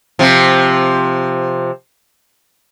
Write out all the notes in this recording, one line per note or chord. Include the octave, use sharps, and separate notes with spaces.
C3 F3